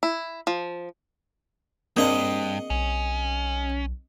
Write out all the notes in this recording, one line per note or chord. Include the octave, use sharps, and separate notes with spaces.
E4
F3
G2 A#3 C4 D4 G#4 D#5 F#5
B1 C#4